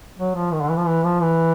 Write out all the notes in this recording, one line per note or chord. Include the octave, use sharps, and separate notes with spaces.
F#3
F3
D#3
D3
E3
F3
E3
F3
E3